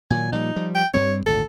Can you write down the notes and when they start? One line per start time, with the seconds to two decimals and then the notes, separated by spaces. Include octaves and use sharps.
0.10 A#2 D#3 F#3 G#5
0.32 A#2 F3 G3 D#4
0.56 F3 G3
0.75 G5
0.94 G2 G3 C4 C#5
1.26 G#1 D2 A#2 A4